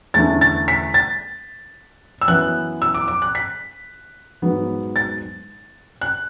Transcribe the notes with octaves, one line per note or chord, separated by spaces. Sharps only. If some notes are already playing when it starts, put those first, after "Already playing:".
E2 D3 A3 C#4 A6
A6
B6
A6
E6
F#2 E3 B3 F#6
E6
D6
D6
F#6
B6
G#2 F#3 B3
A6
F#6